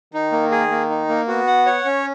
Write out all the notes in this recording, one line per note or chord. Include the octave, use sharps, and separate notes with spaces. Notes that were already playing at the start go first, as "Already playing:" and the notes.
D#3 D#4
A#3
G#4
A#3
D#4
A#3
B3 F#4
F#5
C#5
C#4